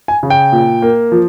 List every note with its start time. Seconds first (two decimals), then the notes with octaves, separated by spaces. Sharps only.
0.08 G#5
0.23 C#3
0.30 G5
0.52 A#2
0.82 A#3
1.12 F3